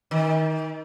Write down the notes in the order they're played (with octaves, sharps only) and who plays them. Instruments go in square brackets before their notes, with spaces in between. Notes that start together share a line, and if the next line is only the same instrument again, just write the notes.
[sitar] D#3